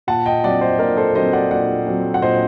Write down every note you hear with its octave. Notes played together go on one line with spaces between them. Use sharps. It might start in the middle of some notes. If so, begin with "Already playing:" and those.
A#2 F#5 A5
D#5 G5
F#3 C4 D5 F#5
C5 D#5
A#2 A#4 D5
A4 C5
F#3 C4 C5 D#5
D5 F#5
A#2 D5 F#5
F#3 C4
F#5
A#2 C5 D#5